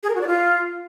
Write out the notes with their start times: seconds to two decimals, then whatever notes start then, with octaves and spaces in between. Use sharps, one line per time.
0.03 G#4
0.09 A#4
0.15 F#4
0.21 D5
0.27 F4